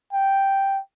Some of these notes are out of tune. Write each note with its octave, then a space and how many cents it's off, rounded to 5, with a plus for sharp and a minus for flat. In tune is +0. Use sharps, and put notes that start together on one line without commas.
G5 +0